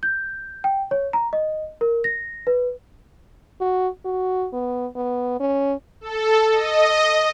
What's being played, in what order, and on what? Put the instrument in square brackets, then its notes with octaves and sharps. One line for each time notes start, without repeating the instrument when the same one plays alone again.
[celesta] G6
G5
C#5
A#5
D#5
A#4
A#6
B4
[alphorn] F#4
F#4
B3
B3
C#4
[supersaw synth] A4
D#5